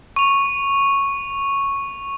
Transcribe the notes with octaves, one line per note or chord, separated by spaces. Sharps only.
C#6 F7